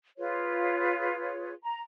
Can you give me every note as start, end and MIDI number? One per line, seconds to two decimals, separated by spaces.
0.18 1.54 65
0.18 1.54 68
0.18 1.54 71
0.18 1.54 73
1.63 1.82 82